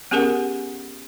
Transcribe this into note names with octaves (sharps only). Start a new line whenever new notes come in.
B3 C#4 G4 G#4 A#4 F#5